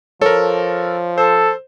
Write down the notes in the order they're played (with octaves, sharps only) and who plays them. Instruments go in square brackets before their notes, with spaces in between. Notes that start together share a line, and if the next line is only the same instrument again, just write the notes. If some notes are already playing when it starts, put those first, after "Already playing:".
[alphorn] F3 [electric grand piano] A4 A#4 [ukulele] C#5
[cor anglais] A4 [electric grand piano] C5